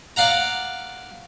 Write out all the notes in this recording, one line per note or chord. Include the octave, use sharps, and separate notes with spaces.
D5 F5 F#5 A#5